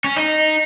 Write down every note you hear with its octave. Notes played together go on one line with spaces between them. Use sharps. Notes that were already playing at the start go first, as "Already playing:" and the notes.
C#4
D#4